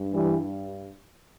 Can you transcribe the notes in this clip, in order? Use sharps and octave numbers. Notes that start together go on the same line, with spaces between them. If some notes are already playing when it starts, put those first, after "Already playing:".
Already playing: G2
E3 G3